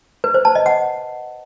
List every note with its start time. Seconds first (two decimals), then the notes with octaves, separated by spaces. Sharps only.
0.24 B4
0.34 C5
0.45 A5
0.55 D#5
0.66 F#5